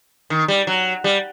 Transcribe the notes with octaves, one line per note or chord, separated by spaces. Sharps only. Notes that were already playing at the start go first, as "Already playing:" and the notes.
D#3
G3
F#3
G3